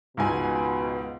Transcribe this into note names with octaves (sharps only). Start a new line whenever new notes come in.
C#2 G#2 B2 G#5